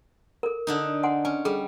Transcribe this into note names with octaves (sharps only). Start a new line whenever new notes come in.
A4 A#4
D3 D4 D#4
F#5 G#5 C6
C#4 G#5
G3 G#4 A4 D6